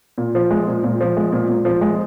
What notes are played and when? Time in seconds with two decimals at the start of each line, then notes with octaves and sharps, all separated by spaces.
0.18 A#2
0.35 F3
0.51 G#3
0.67 A#2
0.84 A#2
1.01 F3
1.17 G#3
1.33 A#2
1.49 A#2
1.65 F3
1.81 G#3